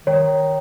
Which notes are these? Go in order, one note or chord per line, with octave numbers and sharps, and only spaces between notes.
D#3 C#5